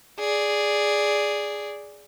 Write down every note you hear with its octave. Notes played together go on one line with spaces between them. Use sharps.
G#4 D5